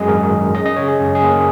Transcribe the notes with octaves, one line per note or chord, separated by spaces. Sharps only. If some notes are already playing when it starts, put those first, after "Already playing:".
Already playing: F#2 F#3 G#3 G#4 D#5
G#1 A#4
D#3
C#4 D#5
D#5
C#3 C#5
G#4
F#2
G#4
A#3
A#4